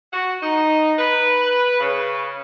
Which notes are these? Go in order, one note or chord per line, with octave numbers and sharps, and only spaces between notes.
F#4
D#4
B4
C#3